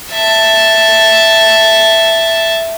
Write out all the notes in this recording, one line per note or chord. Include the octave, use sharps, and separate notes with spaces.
E5 A5